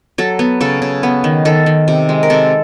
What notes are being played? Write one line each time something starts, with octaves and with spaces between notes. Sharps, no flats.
F#3 A4
B3
C#3 A4
C#3
B3
D#3
D#3 A4
D#3
C3
G#3
A#4
C3 A4